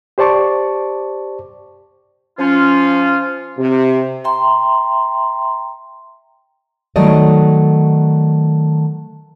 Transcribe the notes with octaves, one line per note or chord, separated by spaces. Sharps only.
G4 C5 D5 A5 C#6 D6
F3 C#4 F4
C3
E5 G5 A#5 C6
D#3 F#3 A3 D5 D#5